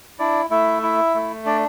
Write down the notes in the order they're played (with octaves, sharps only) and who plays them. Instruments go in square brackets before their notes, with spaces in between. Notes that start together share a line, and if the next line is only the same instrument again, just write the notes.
[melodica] D4 E4 D5
A3 E4 E5
E4
A3
D4 D5